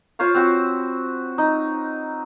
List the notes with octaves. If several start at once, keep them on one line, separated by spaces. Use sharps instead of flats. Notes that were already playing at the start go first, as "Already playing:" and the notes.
F4 C5 C#5 F5
C4 F#4 B4
D#4